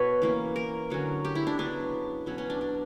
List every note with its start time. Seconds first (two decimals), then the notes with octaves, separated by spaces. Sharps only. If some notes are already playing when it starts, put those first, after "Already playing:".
Already playing: B2 B4 C#5
0.22 E3 A#3 C#4
0.56 A#4
0.90 D3 F#3 C#4
1.25 G4
1.35 E4
1.47 D4
1.58 C#3 F#3 B3 D4
2.26 B2 F#3 C#4
2.38 C#4
2.50 D4
2.61 D4